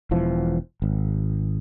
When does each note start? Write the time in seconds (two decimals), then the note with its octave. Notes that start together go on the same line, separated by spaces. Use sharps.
0.11 E1 E3 F3
0.82 G#1